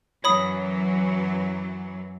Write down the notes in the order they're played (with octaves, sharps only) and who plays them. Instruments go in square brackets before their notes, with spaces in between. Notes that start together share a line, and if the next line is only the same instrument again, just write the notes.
[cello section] F#2 E3 F#3 [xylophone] C#5 B5 D#6